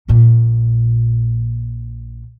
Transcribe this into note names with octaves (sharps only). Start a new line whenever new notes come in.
A#1 A#2